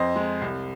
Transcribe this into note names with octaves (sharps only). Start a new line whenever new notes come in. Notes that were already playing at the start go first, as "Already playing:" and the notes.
Already playing: F2 C5 D#5
G#3
C2